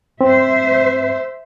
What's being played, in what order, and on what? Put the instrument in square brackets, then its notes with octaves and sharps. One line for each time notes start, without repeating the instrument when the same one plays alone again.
[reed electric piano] C4 [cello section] C5 E5